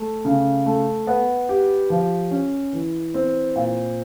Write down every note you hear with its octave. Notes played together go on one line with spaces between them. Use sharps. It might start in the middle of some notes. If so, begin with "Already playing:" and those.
Already playing: A3
C#3
A3
B3
G4
F3
C#4
E3
C4
A#2